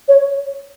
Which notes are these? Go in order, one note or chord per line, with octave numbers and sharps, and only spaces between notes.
C#5